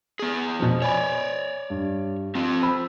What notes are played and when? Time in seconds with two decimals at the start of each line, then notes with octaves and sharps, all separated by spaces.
0.19 B3 G#4
0.59 B2 F3
0.82 C#5 D5 G#5 B5
1.70 G2
2.35 C4 F4
2.63 C5 B5 E6